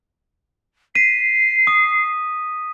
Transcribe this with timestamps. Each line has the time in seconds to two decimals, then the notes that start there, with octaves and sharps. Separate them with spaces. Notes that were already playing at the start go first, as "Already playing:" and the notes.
0.95 B6 C7 D#7
1.67 D#6